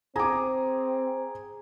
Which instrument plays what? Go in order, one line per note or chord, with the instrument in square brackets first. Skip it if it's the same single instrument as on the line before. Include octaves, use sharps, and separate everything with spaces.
[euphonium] C4 [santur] G#4 [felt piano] A#5 D6